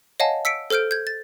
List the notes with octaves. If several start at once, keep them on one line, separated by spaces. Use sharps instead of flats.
C#5 D#5 F5 F#5 G#5 A5
E6 B6 C#7 D7
A4 C5 F6 G6 D7
G6 G#6
A6